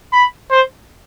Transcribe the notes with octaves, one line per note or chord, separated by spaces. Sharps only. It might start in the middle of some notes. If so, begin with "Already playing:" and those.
B5
C5